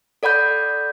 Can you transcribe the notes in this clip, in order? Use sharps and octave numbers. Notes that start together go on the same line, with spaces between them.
A4 D5 F#5 B5 G6